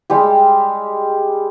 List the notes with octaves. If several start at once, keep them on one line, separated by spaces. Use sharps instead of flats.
G3 G#3 G4